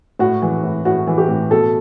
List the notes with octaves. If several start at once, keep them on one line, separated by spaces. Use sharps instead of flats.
A2 F#4
E3
A2
A2 F#4
E3
G4
A2
B2 A4